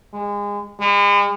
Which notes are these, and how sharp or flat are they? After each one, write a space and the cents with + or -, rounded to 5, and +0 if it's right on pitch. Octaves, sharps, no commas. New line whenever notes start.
G#3 -30
G#3 -45